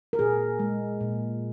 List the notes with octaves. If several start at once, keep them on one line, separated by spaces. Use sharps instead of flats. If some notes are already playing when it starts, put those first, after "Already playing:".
A#4
A#2 G#4
G#3
A#2